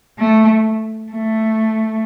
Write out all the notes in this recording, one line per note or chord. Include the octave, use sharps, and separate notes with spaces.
A3
A3